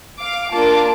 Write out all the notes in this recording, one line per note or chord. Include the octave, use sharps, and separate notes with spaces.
F5 D6
A#3 D4 F4 A5 D6